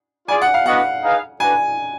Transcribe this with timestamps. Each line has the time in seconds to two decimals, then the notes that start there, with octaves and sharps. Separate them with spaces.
0.28 F4 G#4 D5 G#5
0.42 F#5
0.54 F5
0.65 B3 D4 F#4 B4 D#5 F#5
1.02 D#4 G#4 B4 F5
1.40 D4 F#4 B4 G#5